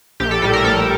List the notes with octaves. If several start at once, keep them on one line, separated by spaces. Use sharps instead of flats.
A#1 G4
A4
A2 G3 A4
A#4
A#1 A4